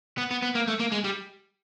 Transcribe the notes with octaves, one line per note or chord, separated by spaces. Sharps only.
B3
B3
B3
A#3
A3
A#3
G#3
G3